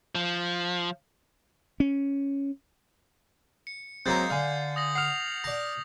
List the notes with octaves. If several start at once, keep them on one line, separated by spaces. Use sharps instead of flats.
F3
C#4
C#7
F#3 G#3 A#3 C4 A#4 G6 A6 C7
D3 F5 G#5
D#6 A#6 F#7
F#5 F6 C7 F7
D5 A5 A#6